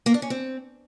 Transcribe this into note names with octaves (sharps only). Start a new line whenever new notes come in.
A#3
D4
C#4
C4